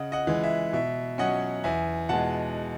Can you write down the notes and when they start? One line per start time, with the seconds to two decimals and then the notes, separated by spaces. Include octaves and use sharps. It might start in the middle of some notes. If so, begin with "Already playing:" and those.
Already playing: C#3 D#5 F#5
0.12 D#5 F#5
0.27 E3 G#3
0.43 E5
0.73 B2 E5
1.18 F#3 C#4 D#5 F#5
1.64 E2 E5 G#5
2.09 B2 G#3 F#5 A5